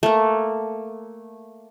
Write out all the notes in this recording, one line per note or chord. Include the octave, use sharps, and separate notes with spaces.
A3 A#3